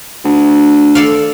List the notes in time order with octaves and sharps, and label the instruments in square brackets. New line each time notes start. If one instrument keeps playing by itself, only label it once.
[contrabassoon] D2
[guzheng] A4 D5 F5